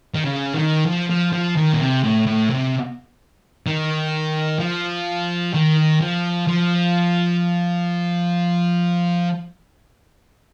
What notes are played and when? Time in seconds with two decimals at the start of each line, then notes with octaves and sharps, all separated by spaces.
0.15 D#3
0.24 C#3
0.54 D#3
0.87 F3
1.10 F3
1.33 F3
1.56 D#3
1.73 A#2
1.80 C3
2.04 A2
2.27 A2
2.50 C3
3.67 D#3
4.60 F3
5.53 D#3
6.00 F3
6.47 F3